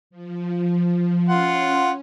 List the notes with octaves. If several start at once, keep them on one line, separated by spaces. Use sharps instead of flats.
F3
C#4 F4 F#5 C6